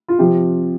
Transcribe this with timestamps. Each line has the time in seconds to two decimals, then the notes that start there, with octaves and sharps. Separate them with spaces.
0.08 F4
0.18 C3 F3 C4 G4